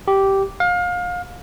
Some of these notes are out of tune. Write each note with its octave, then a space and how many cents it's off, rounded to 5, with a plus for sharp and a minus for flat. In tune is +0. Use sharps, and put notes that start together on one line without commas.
G4 -10
F5 +30